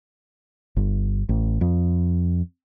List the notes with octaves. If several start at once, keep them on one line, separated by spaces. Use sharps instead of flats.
G1
A1
F2